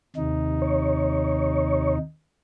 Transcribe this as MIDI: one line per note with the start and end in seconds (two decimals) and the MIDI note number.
0.16 1.98 39
0.16 1.98 48
0.16 1.98 63
0.62 1.95 73